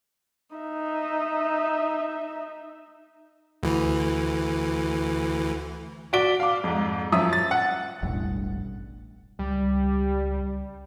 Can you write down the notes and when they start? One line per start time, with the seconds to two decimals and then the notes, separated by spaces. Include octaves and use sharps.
0.55 D#4 E5
3.63 D2 E3
6.13 F#4 D5 B6 D7 G7
6.40 F5 D6
6.64 F2 G#2
7.12 F#2 F3 E5 D#6 E6
7.33 A6
7.51 F#5
8.03 E1 A1 E2 G2
9.39 C#2 G3